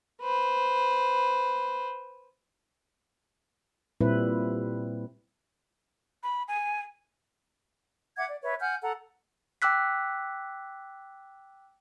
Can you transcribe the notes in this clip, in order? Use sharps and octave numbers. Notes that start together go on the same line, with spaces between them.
B4 C5
A#2 G3 C4 E4 B4
B5
G#5
E5 F#5 D6 G#6
D5
B4 C#5 E5
F#5 G#5 F6 G6
A4 F#5 A#5
G5 D6 E6 F#6 B6